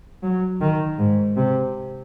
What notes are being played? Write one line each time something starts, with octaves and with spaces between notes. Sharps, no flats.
F#3
D#3
G#2
C3